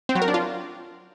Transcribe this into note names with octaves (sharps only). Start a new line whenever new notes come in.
C4
F#3
A#4
D4
F4